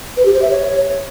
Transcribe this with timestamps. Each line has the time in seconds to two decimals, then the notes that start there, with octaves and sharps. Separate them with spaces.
0.17 B4
0.25 G4
0.34 C5
0.42 E5
0.51 C#5